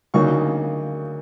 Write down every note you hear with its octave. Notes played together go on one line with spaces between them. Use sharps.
D2 C#3 F#3 A#3 D#4 C#6